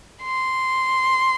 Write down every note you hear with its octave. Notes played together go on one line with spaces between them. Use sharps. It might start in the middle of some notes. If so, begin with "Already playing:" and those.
C6